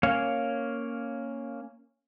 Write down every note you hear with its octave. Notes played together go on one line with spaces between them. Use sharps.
A#3 C#4 C#5 F5